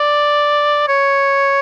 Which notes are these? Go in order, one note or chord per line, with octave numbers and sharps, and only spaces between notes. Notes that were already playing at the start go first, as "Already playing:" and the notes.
Already playing: D5
C#5